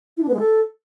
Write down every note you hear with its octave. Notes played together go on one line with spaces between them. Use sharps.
E4
D4
B3
G#3
A4